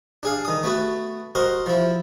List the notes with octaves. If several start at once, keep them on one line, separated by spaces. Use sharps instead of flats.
D4 G#4 F5
D#3 D#6
A3 B3 F#4
F#4 A#4 C5 D#5
F3 E4